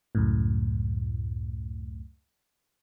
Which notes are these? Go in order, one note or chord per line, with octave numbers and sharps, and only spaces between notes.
C#2 F#2 A2